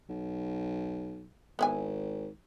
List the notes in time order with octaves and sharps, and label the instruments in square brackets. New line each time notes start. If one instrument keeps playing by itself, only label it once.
[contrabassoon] B1
[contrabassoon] G#1 [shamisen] B3 E4 G#5